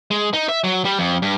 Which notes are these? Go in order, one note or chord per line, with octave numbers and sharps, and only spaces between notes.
G#3
D#4
E5
F#3
G3
F2
G2